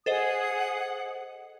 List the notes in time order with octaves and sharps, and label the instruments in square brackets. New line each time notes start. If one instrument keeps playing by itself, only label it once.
[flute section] G#4 F#5 D#6 [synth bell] A4 C5 D#5